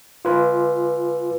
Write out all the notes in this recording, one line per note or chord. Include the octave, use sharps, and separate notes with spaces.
F4 B4